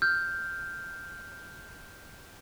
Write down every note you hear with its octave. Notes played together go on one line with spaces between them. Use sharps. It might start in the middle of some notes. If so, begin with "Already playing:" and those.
F6 G6